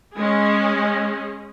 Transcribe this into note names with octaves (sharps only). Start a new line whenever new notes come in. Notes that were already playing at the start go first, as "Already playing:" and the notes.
G#3 C#4 G#4